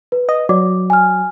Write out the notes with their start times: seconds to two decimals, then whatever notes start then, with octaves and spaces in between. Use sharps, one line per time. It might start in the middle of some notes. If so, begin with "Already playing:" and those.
0.12 B4
0.29 D#5
0.49 F#3 D5 D6
0.90 G#5 F6